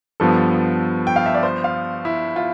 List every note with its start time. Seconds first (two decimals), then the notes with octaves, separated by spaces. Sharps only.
0.20 G2 F3 B3 A4
1.07 G5
1.16 F5
1.26 E5
1.34 D5
1.43 C5
1.64 F5
2.05 E4
2.36 F4